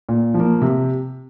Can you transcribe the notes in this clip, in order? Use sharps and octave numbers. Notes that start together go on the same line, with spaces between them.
A#2
F3
A#3
C3